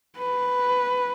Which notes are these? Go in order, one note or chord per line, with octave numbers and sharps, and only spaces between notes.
B4